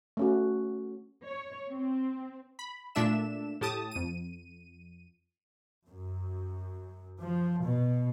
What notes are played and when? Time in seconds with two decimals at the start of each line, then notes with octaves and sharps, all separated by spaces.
0.17 A3 C#4 F#4
1.28 C#5
1.71 C4
2.59 B5
2.95 A#2 A3 D4 E5 E7
3.61 A2 G4 A5 D#6
3.91 F2 D#7
5.86 F#2
7.20 F3
7.63 B2